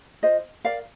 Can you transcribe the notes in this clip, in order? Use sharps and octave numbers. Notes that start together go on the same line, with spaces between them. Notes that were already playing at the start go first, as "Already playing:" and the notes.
F4 C5 D#5
A#4 D5 F5